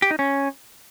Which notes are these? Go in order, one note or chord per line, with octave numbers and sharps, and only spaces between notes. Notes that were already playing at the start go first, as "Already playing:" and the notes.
G4
D#4
C#4